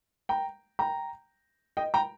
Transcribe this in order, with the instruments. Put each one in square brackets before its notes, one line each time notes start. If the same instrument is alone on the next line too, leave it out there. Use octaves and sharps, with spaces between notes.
[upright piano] G5 A#5
G5 A#5
D#5 G5
G5 A#5